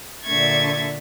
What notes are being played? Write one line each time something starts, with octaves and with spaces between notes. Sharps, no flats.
A#2 D3 E5 C#6 G#6 A6